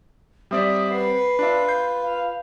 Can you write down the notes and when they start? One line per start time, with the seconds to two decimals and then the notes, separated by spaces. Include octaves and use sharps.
0.51 G3 C4 D5 E5 D#6
0.91 B4 F#5 C7
1.39 D4 F4 E5
1.69 G6
2.02 F5